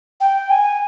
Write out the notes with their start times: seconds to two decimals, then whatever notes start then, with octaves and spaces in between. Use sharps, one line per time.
0.20 G5
0.50 G#5